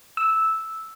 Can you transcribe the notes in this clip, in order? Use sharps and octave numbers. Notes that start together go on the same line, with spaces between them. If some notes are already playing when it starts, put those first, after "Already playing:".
E6